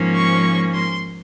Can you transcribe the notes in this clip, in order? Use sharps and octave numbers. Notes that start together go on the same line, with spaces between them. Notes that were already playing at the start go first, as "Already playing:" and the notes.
Already playing: G#2 F3 A#3 C#4
C#6
C6